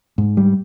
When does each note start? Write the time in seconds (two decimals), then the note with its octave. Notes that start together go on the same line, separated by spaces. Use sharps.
0.18 G#2
0.37 G3